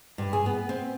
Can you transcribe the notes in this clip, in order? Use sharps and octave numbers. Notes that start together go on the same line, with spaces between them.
G2
G#4
B3
C4